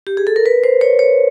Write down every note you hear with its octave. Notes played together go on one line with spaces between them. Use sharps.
G4
G#4
A4
A#4
B4
C5
C#5
C#5